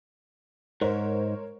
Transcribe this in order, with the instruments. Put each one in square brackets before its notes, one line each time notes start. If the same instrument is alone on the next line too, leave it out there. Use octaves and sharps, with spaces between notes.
[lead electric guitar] G#2 [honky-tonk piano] A#4 C5 C#5